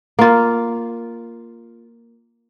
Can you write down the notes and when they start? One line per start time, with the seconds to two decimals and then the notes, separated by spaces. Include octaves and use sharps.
0.19 A#3 F4